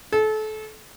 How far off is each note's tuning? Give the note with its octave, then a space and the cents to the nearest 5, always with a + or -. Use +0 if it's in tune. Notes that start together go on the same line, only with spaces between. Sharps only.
A4 -30